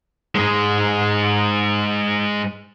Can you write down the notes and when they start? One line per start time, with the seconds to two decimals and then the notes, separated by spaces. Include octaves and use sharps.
0.35 G#2 G#3